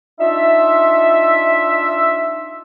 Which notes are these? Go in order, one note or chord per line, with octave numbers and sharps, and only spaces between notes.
D4 D#4 F4 E5